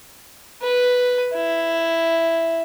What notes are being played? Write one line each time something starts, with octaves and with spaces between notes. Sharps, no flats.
B4
E4